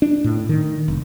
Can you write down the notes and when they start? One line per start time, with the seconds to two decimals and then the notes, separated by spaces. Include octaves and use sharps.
0.02 D4
0.24 A2
0.49 D#3
0.88 F1